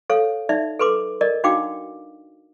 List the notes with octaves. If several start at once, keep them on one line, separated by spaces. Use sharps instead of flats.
A4 C#5 F5
D#4 D5 E5
A4 B4 C6 D6
A#4 D5 D#5
D4 D#4 F#4 F5 G5 D6